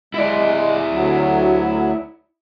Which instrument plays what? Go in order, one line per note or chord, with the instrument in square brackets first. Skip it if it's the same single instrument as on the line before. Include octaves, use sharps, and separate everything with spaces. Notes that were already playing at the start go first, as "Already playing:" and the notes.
[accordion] G#3 [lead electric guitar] E4 D5
[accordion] D2 F#3